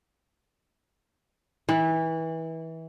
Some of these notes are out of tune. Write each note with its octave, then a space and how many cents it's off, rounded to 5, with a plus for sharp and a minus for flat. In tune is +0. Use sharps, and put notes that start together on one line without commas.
E3 -25